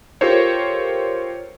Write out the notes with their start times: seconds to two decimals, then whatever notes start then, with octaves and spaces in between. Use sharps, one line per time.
0.21 F4 G4 A4 A#4 C5 C#5